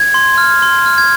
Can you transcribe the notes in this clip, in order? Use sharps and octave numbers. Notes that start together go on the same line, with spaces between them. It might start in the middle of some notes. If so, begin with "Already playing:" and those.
Already playing: G#6
C6
F6
C6
F6
G#6